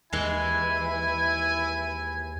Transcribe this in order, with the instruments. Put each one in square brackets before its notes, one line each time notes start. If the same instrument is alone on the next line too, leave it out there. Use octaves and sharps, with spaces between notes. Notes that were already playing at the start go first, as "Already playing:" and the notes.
[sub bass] D#2 [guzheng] E3 G#3 [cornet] E4 [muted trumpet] G#5